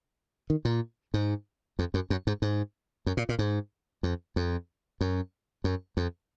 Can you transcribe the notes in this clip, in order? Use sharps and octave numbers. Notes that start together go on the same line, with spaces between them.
D#3
A#2
G#2
F2
F#2
F#2
G#2
G#2
F#2
A#2
A#2
G#2
F2
F2
F#2
F#2
F2